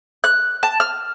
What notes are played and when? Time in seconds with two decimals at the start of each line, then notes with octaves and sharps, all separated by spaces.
0.24 F#6
0.63 A5
0.80 F6